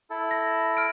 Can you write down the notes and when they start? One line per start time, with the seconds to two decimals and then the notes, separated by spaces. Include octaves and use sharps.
0.10 E4 A4
0.31 A#6
0.77 F6 D7